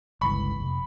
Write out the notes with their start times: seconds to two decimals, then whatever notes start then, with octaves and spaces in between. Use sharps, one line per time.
0.21 G1 C#2 E3 B5 C#6
0.60 F1